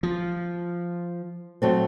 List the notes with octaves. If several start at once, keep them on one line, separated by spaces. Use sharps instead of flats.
F3
F#3 A3 C4